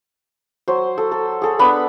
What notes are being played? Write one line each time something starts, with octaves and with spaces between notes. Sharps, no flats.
F#3 C5
A4
A4
G#4 A4
B3 D4 B5